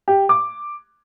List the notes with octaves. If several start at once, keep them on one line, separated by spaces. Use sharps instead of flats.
G4
D6